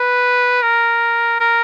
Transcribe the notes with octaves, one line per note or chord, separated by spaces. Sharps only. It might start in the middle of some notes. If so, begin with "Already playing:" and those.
Already playing: B4
A#4
A#4